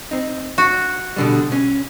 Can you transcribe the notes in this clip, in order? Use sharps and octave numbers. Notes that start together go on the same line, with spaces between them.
C4 D#4
F#4
B2 D3 G3
C#4